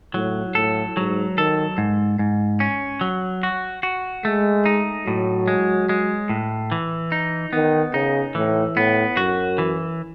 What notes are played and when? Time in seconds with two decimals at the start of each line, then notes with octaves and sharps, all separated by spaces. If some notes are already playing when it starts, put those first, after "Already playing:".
0.14 A2 F#3
0.55 A2 A4
0.96 G#2 F#3
1.37 D#3 A4
1.78 G#2
2.19 G#2
2.60 C#4
3.01 F#3
3.43 F#4
3.83 F#4
4.25 G#3 A3
4.66 D#4
5.06 A2 F#3
5.48 G#3
5.89 G#3
6.29 A2
6.72 E3
7.12 D#4
7.53 D#3 B3
7.94 C#3 D#4
8.35 A2 E3
8.76 A2 B3
9.17 F#2 F#4
9.58 E3